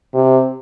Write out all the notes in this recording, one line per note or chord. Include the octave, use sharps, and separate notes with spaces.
C3